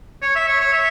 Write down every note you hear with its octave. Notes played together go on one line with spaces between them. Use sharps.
C#5
E5
C#5
C#5
E5